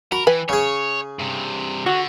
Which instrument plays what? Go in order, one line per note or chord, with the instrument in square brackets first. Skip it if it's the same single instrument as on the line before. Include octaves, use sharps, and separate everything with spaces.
[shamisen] F#4 [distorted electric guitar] A#4 [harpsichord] B5
[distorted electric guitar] E3 [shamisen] B4 G5 G#5
[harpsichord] C#3 G#4 [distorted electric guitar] C#5
[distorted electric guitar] G2 C3
[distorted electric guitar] D3 [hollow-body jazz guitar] F#4